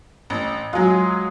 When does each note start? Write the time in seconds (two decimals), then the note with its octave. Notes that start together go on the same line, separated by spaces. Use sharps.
0.30 A1
0.73 F#3 G#3 F4 G#4